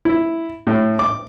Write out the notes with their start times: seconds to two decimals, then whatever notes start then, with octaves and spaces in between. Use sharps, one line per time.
0.05 E4
0.67 A2
0.99 D6